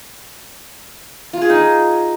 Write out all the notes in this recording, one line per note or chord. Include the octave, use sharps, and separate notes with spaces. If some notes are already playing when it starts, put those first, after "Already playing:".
F4
G#4
D#4